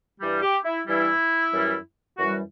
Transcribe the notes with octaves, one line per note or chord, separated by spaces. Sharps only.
G2 E3 G3
G4
E4
G2 E3 G3 E4
F#2 E3 G3
F#2 E3 G3 F#4